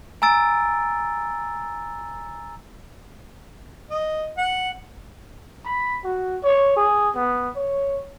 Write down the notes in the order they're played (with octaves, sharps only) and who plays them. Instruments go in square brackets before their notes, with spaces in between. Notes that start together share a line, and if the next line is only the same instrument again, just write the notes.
[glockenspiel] G#5 A#5 E6 A6 D7
[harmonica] D#5
F#5
[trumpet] B5
F#4
C#5
G#4
B3
C#5